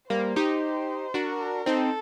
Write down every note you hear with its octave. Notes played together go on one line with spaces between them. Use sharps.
G3 A#3 C5
D#4 G4
D4 F#4 A#4
C4 D#4 A4